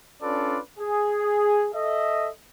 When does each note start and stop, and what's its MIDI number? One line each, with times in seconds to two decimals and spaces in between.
0.22 0.59 61
0.22 0.59 62
0.22 0.59 65
0.22 0.59 69
0.22 0.59 71
0.22 0.59 74
0.79 1.68 68
1.74 2.29 69
1.74 2.29 75
1.74 2.29 76